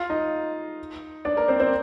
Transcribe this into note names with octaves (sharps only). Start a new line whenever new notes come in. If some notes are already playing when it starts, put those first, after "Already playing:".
Already playing: F4 F5
D#4 D#5
D4 D5
A#3 A#4
C4 C5
C4 C5